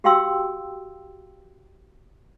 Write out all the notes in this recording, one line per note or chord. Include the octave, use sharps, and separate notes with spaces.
F#4 G4 F5 G5 C6 E6